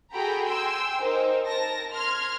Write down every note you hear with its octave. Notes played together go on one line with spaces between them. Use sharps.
F#4 G#4 A4 G5 A#5 B5
G5 G#5 C6 E6
D#4 A#4 C5
A#4 A5 A#6
C6 F6 G#6